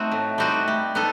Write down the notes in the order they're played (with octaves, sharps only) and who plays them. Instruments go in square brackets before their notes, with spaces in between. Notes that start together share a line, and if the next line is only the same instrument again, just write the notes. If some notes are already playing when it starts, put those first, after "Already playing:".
Already playing: [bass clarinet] A3 [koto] C4 D#4 F#4
[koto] A2
G3 C4 D#4 F#4
[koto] G3 [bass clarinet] A3
[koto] B3 D#4 A4